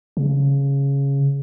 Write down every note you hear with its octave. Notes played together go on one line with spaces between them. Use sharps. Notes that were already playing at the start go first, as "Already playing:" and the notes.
C#3